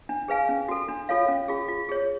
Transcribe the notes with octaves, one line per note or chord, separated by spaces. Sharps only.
D4
G#4 B4 F5 G#5
C#4
F#4 A4
D4
F4 A4 C#5 F5
C#4
F4 G#4
F4
G#4 C#5